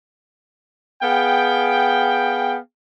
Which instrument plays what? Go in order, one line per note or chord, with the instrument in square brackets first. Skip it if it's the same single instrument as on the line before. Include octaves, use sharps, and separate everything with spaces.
[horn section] B3 G#4 F5 G5